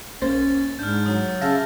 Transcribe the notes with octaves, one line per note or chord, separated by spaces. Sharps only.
B1 A#3 C#4 C5 A6
G#2 D4 F6 G6
F#3 D#6
C#3 E5 F5 A5 A#6